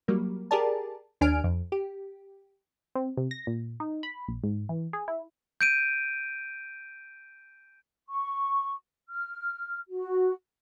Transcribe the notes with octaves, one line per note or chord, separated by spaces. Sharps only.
F#3 G3 A#3
G4 G#4 A#4 D5 A5
D#2 D4 G#5 F6 D7
F2
G4
C4
C3
A#6
A#2
D#4
B5
A#1
G#2
E3
G#4
E4
G6 D7 D#7
C#6
F6
F#4